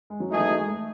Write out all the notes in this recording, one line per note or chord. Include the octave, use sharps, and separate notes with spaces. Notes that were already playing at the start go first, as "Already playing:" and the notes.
G#3
F#3
E3 G#3 A3 D#4 G#4
F#3
G#3
G#3
A3